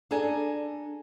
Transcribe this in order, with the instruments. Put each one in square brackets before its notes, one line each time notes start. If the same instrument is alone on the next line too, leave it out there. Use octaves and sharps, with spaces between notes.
[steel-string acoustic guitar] D4 G#4 A4 G#5 A#5